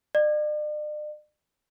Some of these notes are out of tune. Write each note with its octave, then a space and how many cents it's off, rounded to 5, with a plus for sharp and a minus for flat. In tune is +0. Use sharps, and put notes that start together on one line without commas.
D5 +45